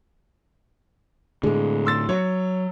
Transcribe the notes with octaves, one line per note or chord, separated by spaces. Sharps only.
A2 D3 G#3
C6 E6 A6
F#3 C#5